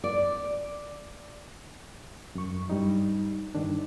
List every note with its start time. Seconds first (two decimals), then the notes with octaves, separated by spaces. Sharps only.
0.04 D5
2.35 F#2 C#6
2.70 G2 G3 D#4
3.55 G2 D#3 D4